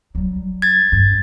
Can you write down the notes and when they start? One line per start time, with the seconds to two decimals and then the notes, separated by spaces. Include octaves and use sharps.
0.15 F#3 G3
0.62 G#6 A6
0.92 G2